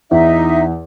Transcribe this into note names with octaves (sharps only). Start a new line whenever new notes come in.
E2 D#4 E5